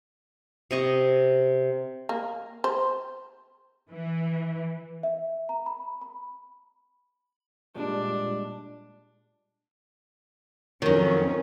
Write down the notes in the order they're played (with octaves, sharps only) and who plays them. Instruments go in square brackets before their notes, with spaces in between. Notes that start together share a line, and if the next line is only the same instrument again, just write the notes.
[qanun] C3 D#5 C#6
[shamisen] A#3
C5
[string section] E3
[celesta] E5
A#5
B5
B5
[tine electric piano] A#2 G3 G#3 [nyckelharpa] D4
[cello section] F2 C#4 [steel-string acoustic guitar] D#3 F#3